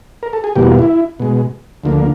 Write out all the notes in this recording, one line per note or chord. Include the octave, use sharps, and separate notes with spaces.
A#4
A4
G#4
E2 B2 G3 A#3 G4
F#4
F4
E4
B2 G#3
D2 D3 F3 A#3